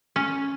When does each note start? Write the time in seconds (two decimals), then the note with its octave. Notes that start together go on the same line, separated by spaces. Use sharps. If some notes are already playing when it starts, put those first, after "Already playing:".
0.16 C#4